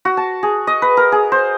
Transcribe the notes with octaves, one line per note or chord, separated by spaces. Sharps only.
F#4
A5
G#4
D#5
B4
A#4
G#4
C5